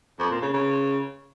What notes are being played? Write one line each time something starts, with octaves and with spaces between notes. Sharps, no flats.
F2
A#2
C#3
C#3